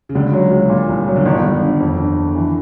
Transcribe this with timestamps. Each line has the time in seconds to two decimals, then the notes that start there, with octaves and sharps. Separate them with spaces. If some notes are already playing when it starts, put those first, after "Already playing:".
0.09 C#3
0.15 C#2 D3
0.33 F#3
0.51 C#2
0.70 A#2
0.89 C2
1.07 F#3
1.16 D3
1.25 G1 D#3
1.44 G1
1.62 D3
1.80 F2
1.99 D3
2.17 D3
2.35 E3